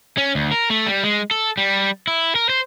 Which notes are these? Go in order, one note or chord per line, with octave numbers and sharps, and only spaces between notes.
C#4
D2
A#4
A3
G3
G#3
A4
G3
E4
A#4
C5